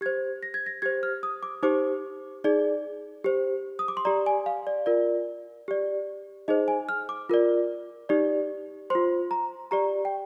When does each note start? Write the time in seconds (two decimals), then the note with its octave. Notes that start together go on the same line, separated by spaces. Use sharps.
0.01 G4 C5 G#6
0.43 A#6
0.54 G#6
0.66 A#6
0.82 G4 C5 G#6
1.03 F6
1.23 D#6
1.43 D6
1.63 D#4 G4 C5 D6
2.44 D#4 G#4 D5
3.24 G4 C5
3.79 D#6
3.88 D6
3.97 C6
4.05 G4 D5 A#5
4.26 G#5
4.46 F5
4.67 D5
4.86 F4 A#4 D5
5.68 G4 D5
6.48 D#4 G#4 C5 D#5
6.68 G#5
6.89 F6
7.09 D6
7.29 F4 A#4 D5
8.09 D#4 G4 D5
8.90 F4 C5 C6
9.31 A#5
9.71 G4 D5 A#5
10.05 G5